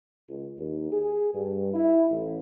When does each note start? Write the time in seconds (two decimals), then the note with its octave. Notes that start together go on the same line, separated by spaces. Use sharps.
0.29 C#2
0.58 D#2
0.92 G#4
1.34 G2
1.74 E4
2.11 A1